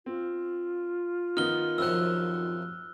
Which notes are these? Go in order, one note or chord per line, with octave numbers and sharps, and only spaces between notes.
C4 F4
D#3 B3 D#4 F6 G7
F#2 C3 F3 E6 F#6